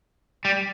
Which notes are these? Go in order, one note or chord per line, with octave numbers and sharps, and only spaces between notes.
G3